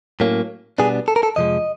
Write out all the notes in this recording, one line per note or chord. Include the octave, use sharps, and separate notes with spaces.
A2 F#3 A#3 C#4
B2 G3 B3 D4 G#4
A4
A#4
A4
F2 C3 F3 G#3 D#5